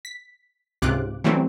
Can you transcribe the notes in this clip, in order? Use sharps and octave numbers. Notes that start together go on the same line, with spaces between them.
B6
C#2 G#2 C3 F4 D6 F#6
E3 F#3 G3 A3 C4 C#4